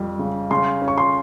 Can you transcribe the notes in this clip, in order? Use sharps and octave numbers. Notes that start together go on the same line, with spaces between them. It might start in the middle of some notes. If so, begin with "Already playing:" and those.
Already playing: F2 G3
C#3
C#3 C6
C#4
C#6
C6